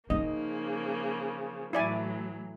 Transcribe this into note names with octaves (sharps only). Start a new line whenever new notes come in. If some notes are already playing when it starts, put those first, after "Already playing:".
C#3 F3 A#3 D#4 D#5
A2 E3 F#3 E4 D5 G#5